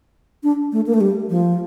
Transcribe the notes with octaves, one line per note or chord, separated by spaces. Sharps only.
D4
A3
A#3
A3
G3
F3